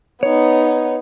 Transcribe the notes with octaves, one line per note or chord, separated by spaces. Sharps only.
B3 D#4 C#5